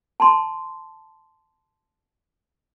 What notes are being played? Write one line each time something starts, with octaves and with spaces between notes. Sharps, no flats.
A5 A#5 C6